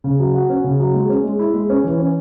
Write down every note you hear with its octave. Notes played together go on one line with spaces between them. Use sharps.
C#3
F#3
F#4
C#4
C#3
F#3
G#3
C#4
G#3
E4
G#3
C#4
E3
C#4